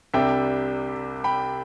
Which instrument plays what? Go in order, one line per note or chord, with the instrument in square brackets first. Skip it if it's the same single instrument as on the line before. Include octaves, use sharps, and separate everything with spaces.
[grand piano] C2 C3 G3 D4 E5 G5
G5 B5